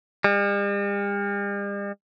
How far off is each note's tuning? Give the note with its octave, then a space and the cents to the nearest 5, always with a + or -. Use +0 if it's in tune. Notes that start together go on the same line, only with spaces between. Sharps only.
G3 +45